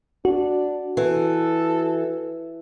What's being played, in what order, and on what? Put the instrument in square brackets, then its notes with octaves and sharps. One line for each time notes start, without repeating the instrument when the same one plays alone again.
[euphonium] D4 [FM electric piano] F#4
[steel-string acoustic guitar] E3 [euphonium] A4